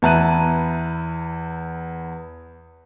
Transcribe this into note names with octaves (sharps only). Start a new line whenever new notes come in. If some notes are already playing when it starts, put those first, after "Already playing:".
E2 E4 A5 A#5 F#6 D#7